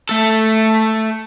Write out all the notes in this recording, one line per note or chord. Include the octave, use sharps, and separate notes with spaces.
A3 A4